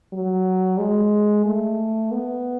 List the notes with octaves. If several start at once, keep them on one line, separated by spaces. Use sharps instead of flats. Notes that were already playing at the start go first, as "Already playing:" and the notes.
F#3
G#3
A3
B3